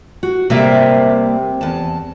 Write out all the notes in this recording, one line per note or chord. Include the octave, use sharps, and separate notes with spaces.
F#4
C3 G3 A#3 E5
E2 A5